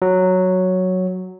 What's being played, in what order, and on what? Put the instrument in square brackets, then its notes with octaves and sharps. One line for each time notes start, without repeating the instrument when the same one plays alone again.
[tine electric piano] F#3